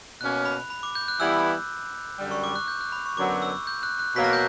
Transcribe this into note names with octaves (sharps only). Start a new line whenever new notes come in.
B2 A#3 C#4 F#6
B5
B5
D6
G6
F#6
E3 G3 B3 E4 E6
F#2 D3 G3
C#6
D6
F#6
G6
F#6
B5
C#6
F#2 D3 F#3 B3 D6
E6
G6
F#6
F#6
B2 F#3 A#3 B6
A#6
G6